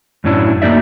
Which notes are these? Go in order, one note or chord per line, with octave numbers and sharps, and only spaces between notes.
F#2 A2 F#3 C#4 D4 E4
A3 A#3 D#4 F#4 D5 E5